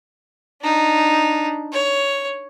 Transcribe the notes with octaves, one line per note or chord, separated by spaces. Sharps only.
D4 D#4
C#5